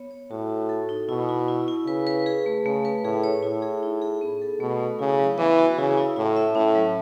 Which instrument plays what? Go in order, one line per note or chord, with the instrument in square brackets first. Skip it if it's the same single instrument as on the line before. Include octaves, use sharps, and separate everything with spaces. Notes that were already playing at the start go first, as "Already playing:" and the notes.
Already playing: [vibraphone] B3 C#5
C#5
[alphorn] A2 [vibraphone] F#4
[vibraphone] F#4
A4
D#4
[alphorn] B2 [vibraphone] E4
[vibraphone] E4
E4
E4
[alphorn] C#3 [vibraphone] B4
[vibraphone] B4
G#4
A3
[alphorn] C#3 [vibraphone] A3
[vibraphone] B4
[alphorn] A2 [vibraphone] G#4
[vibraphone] C#5
[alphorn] A2 [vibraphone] E4
[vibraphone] G#4
D#4
G#4
B3
A4
[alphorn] B2 [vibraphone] A3
[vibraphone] A3
[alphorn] C#3 [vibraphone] E4
[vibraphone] F#3
[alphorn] E3 [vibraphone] B3
[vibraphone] F#4
[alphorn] C#3 [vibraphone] E4
[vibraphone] E4
[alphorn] A2 [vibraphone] E4
[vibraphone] E5
[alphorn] A2 [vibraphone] C#4
[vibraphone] F#3